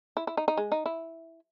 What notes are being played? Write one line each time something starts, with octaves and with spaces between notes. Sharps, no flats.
E4
E4
D#4
D#4
G#3
D#4
E4